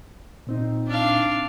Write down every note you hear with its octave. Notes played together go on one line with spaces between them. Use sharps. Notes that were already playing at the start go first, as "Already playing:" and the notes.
A#2 C4 D#4
D4 F5